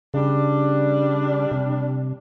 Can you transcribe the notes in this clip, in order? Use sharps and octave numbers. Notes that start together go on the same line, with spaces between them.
C#3 G3 D4
C3